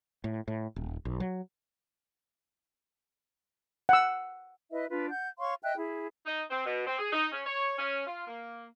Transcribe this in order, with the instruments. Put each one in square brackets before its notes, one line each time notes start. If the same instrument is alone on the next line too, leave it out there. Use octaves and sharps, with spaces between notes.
[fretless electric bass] A2
A2
D#1
B1
F#3
[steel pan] F#5 E6
[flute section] E4 B4 D#5 E5
D4 F4 B4
F#5 G6
C#5 F5 C6 C#6
D#5 E5 G5 F#6
E4 G#4
[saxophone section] D#4
C4
B2
C4
G#4
D#4
C#4
C#5
C#4
F4
A#3